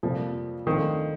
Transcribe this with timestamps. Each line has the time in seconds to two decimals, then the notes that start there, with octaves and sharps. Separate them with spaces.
0.03 F2 C3 F3 G3 A#3
0.66 D2 D3 D#3 F3 A3 C4